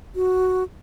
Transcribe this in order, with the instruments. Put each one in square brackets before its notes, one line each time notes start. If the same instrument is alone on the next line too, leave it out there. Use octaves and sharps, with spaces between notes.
[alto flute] F#4